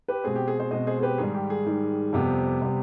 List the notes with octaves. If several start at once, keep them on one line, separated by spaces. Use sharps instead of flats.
G4 B4
B2 G#3 C4 G#4
G4
G#4
G#4 C5
B2 G#3 C4 C5 D#5
G#4 C5
G#4
G4 B4
G#2 D#3 G3 G#4
G4
G#4
G#2 D#3 G3
F2 C3 G3 B3 G4
C3 G3 B3